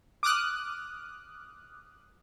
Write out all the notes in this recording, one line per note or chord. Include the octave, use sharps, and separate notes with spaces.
D6 D#6 F6 F#6